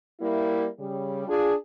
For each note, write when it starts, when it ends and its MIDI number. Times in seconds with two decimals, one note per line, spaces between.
0.20 0.66 55
0.20 0.66 58
0.20 0.66 64
0.79 1.24 49
0.79 1.24 55
1.28 1.53 62
1.28 1.53 65
1.28 1.53 68